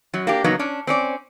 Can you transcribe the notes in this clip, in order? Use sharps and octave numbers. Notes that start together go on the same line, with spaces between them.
F#2 F#3
A#3 D4 G4
C#3 F#3 A#3 B3 D#4
C#4 D4
C4 C#4 D5